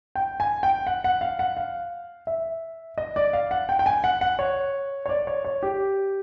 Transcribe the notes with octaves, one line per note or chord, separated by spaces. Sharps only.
G5
G#5
G5
F#5
F#5
F5
F#5
F5
E5
D#5
D5
F5
F#5
G5
G5
G#5
F#5
F#5
C#5
C#5
D5
C#5
C#5
G4